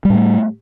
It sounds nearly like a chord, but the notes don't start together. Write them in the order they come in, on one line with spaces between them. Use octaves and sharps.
G3 A2 A3